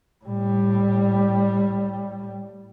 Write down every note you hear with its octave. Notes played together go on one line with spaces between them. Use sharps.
A2 G3